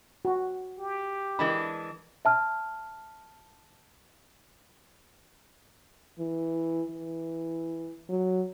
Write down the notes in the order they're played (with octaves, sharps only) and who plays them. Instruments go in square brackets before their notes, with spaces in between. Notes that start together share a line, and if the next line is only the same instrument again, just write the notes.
[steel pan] F#4
[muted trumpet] G4
[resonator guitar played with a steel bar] E3 G#3 D4 [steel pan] A#4 B5
[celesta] E5 A5 F6
[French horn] E3
E3
F#3